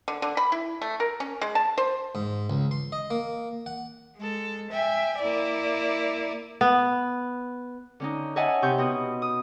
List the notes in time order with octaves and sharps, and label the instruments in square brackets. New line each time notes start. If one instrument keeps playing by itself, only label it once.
[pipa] D3
D3
B5
E4
A3
A#4
C#4
G#3
A5
C5
[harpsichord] G#2
C#2
C6
D#5
A#3
F#5
[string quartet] G#3 A4
E5 G5 G#5
A#3 E4 D5
[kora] B3
[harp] D3 C#4 D#4
C#5 D#5 E5 F#5 G#5 A5
C3 C#6 G6
B2 F#4 D#6
D#6